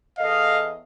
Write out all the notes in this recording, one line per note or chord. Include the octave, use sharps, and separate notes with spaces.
E2 A4 D#5 F5